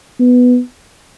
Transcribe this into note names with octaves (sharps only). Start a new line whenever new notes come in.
B3